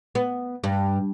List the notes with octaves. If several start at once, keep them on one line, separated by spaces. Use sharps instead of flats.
B3
G2